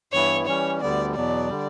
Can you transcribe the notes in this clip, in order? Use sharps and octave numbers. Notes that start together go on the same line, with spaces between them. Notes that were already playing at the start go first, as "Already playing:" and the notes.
G2 E3 B3 E4 C#5
E3 G3 C#4 C#5
D2 D3 G3 B3 D5
E2 B2 F#3 B3 D5
D3 G3